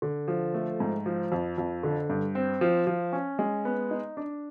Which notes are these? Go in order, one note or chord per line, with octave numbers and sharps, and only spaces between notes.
D3
F3
A3
G#2
F3
F2
F2
D3
G2
C4
F3
F3
C#4
G#3
B3
D#4
D4